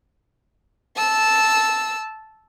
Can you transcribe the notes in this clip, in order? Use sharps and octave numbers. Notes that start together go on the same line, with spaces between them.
A5 E6